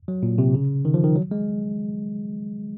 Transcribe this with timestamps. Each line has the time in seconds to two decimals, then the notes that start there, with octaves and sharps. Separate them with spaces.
0.08 F#3
0.23 A#2
0.38 C3
0.54 C#3
0.85 D#3
0.94 F3
1.04 D#3
1.16 F#3
1.31 G#3